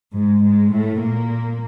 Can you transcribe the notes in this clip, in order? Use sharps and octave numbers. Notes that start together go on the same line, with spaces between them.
G#2 G#3
G#2 G#3
A2 A3
A#2 A#3